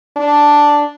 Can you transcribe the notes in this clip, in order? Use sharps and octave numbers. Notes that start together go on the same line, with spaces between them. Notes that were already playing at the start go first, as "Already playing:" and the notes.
D4